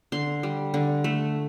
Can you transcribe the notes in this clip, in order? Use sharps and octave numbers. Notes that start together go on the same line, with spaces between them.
D3 C6
G3
D3
A3